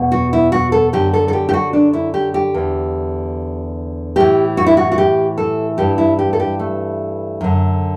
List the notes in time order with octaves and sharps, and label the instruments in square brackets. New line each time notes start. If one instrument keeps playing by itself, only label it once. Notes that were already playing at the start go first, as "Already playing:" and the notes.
Already playing: [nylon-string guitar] E2 B2
F#4
E4
F#4
A4
F#2 D3 G4
A4
A4
G4
G4
F#4
D4
E4
G4
G4
E2 D3
A2 E3 G4
F#4
E4
F#4
F#4
G4
A4
G2 E3 G4
E4
G4
A4
G4
A3
F#2 D3